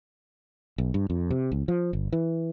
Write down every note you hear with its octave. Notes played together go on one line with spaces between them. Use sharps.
B1
G2
F2
C3
C#2
F3
G1
E3